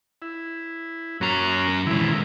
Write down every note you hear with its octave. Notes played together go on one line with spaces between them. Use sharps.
E4
F#2 F#3 A#3 C#4 A#5
D#2 A#2 E3 G#3 E4